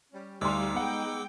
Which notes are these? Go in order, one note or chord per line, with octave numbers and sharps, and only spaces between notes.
G3 C#4
D2 G3 D#4 F5 C6 D6 E6
G#3 B3 F#5 G5